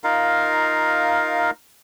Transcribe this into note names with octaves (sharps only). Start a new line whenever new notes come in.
D#4 F4 A#4 F5